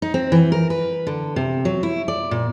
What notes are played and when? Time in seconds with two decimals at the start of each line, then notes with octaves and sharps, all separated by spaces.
0.02 D#4
0.14 C4
0.32 E3
0.52 A#4
0.70 B4
1.07 D3
1.36 C3
1.65 F#3
1.83 E4
2.08 D5
2.31 A#2